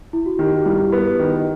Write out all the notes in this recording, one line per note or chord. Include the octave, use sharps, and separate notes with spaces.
E4
F#4
D#3 G4
F#4
G2 E4
E4
B3 F#4
D#3
D#5